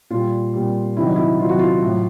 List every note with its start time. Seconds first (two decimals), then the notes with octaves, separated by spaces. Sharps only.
0.10 A#2 G3 F4
0.54 A#2 G3
0.97 C3 D#3 F#3 E4
1.07 D#4
1.16 E4
1.39 C3 D#3 F#3 F4
1.49 F#4
1.59 F4
1.82 A2 F#3